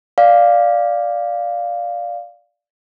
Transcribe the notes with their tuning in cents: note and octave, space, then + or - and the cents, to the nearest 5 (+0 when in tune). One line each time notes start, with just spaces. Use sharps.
D5 +0 F5 +0